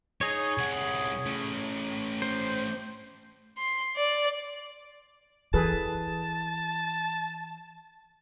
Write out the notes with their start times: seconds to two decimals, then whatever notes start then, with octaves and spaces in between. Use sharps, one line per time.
0.21 D#4 G#4 C#5
0.58 C2 F#5
1.26 A3 C#4
2.22 C5
3.58 C6
3.96 D5
5.54 E3 G#4 A4 B4 A5